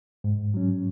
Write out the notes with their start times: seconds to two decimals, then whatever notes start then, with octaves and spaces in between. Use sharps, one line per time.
0.24 G#2
0.54 F#3 C#4